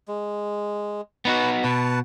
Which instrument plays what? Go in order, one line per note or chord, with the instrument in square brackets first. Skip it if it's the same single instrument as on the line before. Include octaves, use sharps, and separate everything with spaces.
[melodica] G#3
[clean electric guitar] B3 D#4 F#4 [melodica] B4
[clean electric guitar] B2 [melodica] B4 F#5 A5